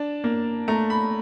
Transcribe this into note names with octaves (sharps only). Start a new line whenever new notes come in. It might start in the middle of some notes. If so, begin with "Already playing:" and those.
Already playing: D4 A5
A#3
A3 A#5
B5